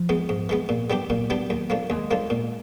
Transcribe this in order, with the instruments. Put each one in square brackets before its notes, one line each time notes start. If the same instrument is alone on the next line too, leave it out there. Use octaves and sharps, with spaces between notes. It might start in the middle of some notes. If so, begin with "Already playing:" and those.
Already playing: [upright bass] F3
[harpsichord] E3 G#3 B3
G#2
E3 G#3 B3
A#2
G3 B3 D4 G4
[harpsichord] A#2 [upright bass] F#3
[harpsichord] G3 B3 D4 G4
D#2
D3 F3 A#3
[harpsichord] D#2 [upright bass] G#3
[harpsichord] D3 F3 A#3
A#2